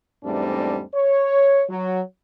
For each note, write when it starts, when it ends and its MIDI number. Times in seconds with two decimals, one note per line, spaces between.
0.24 0.81 40
0.24 0.81 44
0.24 0.81 55
0.24 0.81 57
0.24 0.81 60
0.24 0.81 62
0.95 1.64 73
1.70 2.01 54